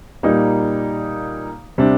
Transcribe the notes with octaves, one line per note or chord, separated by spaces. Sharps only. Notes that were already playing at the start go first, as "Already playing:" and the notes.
A#2 G3 A#3 D#4
C3 G3 D4